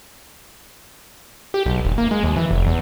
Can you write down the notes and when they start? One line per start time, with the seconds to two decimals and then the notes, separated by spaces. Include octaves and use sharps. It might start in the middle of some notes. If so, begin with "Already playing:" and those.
1.54 G4
1.66 B1
1.85 D#1
1.98 A#3
2.11 G#3
2.23 D#2
2.36 E3
2.51 F1
2.67 E2